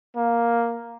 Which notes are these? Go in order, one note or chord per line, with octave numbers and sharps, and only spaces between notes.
A#3